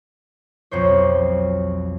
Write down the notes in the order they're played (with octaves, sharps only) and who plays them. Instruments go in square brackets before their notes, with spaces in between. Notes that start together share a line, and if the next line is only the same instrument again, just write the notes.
[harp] B1 F2 C5 C#5